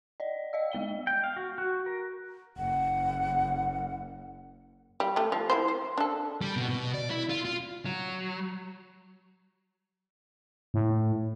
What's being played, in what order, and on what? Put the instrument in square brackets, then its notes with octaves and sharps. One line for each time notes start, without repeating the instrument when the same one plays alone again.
[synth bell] D5 D#5
D#5 F5 E6
G#3 B3 G5 G7
[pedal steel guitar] G5
F5
F#4
F#4
A#4
[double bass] F#1 [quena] F#5
[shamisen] G3
G3 A3
F3
E4 F4 C5
C5
D4 A4
[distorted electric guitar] G3
B2
B2
D5
E4
F4
F4
[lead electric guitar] F#3
[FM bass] A2